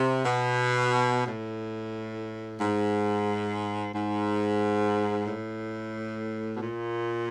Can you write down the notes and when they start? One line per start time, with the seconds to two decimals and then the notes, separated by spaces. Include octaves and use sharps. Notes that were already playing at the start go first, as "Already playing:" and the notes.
Already playing: C3
0.25 B2
1.26 A2
2.60 G#2
3.93 G#2
5.27 A2
6.56 B2
6.61 A#2